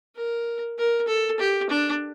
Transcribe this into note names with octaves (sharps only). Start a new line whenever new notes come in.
A#4
A#4
A4
G4
D4